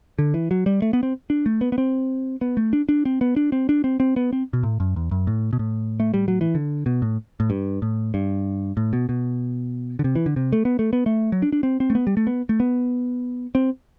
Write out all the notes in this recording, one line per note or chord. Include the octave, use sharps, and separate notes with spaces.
D3
E3
F#3
G3
A3
B3
C4
D4
A3
B3
B3
C4
B3
A3
D4
D4
C4
B3
D4
C4
D4
C4
C4
B3
C4
B2
A2
F#2
E2
F#2
A2
B2
A2
A3
G3
F#3
E3
D3
B2
A2
A2
G2
A2
G2
A2
B2
B2
D3
C3
E3
D3
C3
A3
B3
A3
B3
A3
F#3
D4
D4
C4
C4
A3
B3
G3
A3
B3
A3
B3
C4